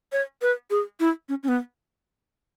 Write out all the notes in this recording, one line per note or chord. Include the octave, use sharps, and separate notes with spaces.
C#5
B4
G#4
E4
C#4
C#4
B3